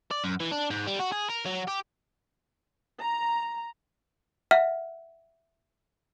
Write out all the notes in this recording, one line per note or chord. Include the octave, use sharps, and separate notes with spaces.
D5
F#2
E3
D4
G#2
G3
F#4
G#4
A#4
F#3
G4
A#5
E5 F#5 F6